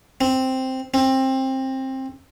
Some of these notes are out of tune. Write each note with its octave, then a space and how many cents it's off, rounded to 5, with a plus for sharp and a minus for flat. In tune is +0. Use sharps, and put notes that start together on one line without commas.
C4 +0
C4 +20